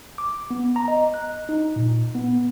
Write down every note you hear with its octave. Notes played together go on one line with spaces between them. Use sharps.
D6
B3
A#5
D#5
F#6
D#4
A#2
B3